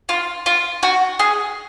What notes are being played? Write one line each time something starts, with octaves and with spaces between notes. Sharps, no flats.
F4
F4
F#4
G#4